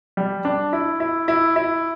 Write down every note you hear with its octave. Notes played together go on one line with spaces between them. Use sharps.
G3
D4
E4
E4
E4
E4